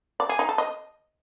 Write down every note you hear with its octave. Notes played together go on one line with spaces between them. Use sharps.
D5
G#4
D#4
A4
D#5